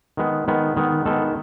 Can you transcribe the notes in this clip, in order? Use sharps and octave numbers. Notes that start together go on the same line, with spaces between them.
D#3 G#3 B3
D#3 G#3 B3
D#3 G#3 B3
D#3 G#3 B3 A4